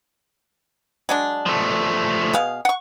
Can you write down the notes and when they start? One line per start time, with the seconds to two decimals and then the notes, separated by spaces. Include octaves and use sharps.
1.09 F#3 G#3 D4
1.46 F3 A3
2.33 B2 G#4 F5
2.65 F#5 C#6